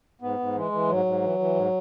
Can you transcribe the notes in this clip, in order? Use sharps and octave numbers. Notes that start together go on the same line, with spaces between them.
G#2 B3
G#2
E3 G#3
E3
G#2 F#3
G#2
E3
E3
G#2